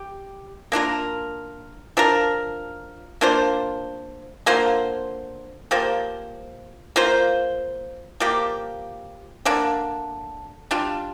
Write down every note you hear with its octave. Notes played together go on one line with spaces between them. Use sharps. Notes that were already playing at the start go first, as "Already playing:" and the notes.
Already playing: G4
A#3 D4 F4 A#4
F3 D4 A#4
A#3 D4 F4 C5
D3 A#3 F4 C5
F3 A#3 G4 C5
A#3 F4 C5
F3 A#3 G4
D3 A#3 D4
G3 D4 F4